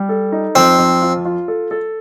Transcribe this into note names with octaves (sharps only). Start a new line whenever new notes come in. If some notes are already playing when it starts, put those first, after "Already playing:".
Already playing: G3
A4
D#4
F2 C4
F2
F4
F4
A4
A4